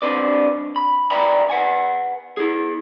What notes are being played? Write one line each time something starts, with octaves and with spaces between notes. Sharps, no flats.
C4 D4 B4 D5
B5
B4 D5 E5 G5 A#5 B5
B4 F#5 G#5
E4 G#4